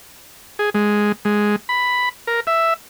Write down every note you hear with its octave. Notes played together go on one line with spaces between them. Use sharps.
G#4
G#3
G#3
B5
A#4
E5